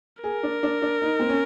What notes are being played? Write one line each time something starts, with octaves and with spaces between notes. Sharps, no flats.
G#4 A#4
D4
D4
D4
D#4
C4
C#4